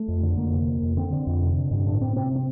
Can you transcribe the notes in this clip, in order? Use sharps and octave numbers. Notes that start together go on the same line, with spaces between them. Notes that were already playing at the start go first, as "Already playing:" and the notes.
Already playing: A3
F2
D3
F2 A#3
C3
F2
F2
D3 C4
D3
F2
C3
D3
G2
A2 D4
A2 C4
C3 C4
C4